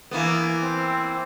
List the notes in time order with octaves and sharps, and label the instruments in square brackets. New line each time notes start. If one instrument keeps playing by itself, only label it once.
[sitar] E3 A#3 B3
[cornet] C4